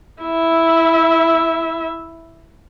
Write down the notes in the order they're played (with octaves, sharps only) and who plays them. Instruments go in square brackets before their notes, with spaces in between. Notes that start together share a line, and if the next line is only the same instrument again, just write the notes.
[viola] E4 E5